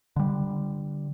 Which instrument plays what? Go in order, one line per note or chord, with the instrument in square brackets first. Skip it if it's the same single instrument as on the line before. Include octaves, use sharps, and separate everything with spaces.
[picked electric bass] D3 G3